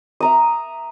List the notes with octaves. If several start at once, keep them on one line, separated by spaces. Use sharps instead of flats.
E5 A#5 D#6